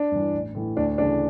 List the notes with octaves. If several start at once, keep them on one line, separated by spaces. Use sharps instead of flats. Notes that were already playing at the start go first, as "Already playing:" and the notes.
Already playing: D4
G2 E3
A1
A2 E3
D2 D4
C#3 E3 D4